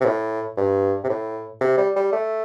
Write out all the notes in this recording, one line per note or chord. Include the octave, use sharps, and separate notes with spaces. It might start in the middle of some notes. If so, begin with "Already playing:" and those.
C3
A2
G2
C3
A2
C3
G3
G3
A3